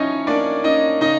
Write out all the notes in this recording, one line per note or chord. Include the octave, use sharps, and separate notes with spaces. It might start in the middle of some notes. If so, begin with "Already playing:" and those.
Already playing: F3 C#4 D#4 E4 C#5 D#5
A#3 D4 D5
C#4 D#4 D#5
C#3 D#4 D#5